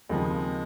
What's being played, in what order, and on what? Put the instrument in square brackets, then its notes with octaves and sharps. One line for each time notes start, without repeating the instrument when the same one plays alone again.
[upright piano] D#2 C#3 F3 C4 [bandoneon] G#3